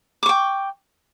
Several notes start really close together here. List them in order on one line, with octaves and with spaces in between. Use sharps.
D6 C#6 G5